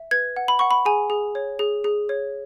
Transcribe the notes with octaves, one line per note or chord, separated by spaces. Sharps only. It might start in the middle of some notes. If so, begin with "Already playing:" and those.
Already playing: E5
B4 G#6
F#5
B5
F#5 C#6
B5
G#4 G#5
G#4
C#5
G#4
G#4
C#5